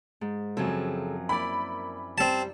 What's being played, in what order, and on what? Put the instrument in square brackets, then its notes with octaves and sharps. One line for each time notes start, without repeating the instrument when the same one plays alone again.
[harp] G#2
[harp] F#2 F3 C4 [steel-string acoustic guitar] C#3 G#4 A4
[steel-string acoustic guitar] A#3 [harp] E4 D5 [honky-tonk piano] B5
[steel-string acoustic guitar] G3 [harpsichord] C4 A5